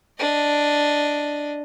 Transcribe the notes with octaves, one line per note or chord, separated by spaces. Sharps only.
D4 D#5